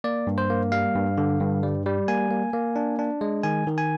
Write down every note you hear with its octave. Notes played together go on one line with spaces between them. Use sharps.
A#3 D5
G2
C5
A#3
G3 F5
G2
D3
G2
G3
G3
A#3 G#5
A#3
A#3
D4
D4
G#3
D#3 G#5
D#3
G#5